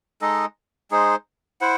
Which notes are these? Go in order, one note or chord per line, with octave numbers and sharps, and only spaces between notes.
G#3 D#4 A4 D#5
G#3 D#4 G#4 C5
E4 C5 F#5